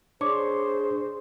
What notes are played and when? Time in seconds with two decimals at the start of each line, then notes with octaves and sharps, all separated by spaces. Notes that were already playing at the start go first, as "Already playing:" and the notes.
0.21 D4 G#4 C5 C#5 C#6 D6